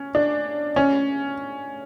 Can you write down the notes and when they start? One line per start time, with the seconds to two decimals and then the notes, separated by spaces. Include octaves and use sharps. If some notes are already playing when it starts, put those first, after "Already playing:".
Already playing: C#4
0.15 D4
0.76 C#4